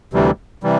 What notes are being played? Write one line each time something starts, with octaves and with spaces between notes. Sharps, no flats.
D2 C3 E3 G3
C3 E3 G3